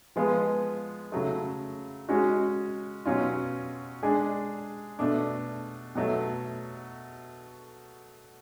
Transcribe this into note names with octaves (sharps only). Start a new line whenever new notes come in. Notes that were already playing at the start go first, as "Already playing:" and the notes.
F3 G#3 B3 F4
C#3 F#3 A3
G#3 C#4 F#4
B2 F#3 C#4 F4
G#3 D4 G#4
B2 A3 D4
B2 F#3 A3